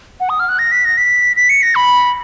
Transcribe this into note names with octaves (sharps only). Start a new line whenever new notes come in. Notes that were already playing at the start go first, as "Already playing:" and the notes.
F#5
D#6
F6
F#6
A#6
B6
A#6
B6
B6
C#7
A#6
B5